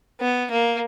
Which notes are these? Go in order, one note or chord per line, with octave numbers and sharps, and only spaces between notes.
B3
A#3